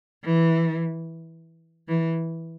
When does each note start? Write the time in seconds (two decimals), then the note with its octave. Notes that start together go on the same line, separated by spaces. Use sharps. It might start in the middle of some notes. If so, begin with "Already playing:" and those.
0.24 E3
1.88 E3